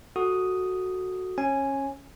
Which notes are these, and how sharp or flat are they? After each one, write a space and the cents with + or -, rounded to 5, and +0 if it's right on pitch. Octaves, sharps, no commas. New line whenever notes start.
F#4 +0 A4 +0 D#6 +0
C#4 -25 G#5 +0